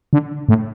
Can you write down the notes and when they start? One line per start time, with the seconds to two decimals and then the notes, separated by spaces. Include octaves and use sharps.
0.13 D3
0.49 A2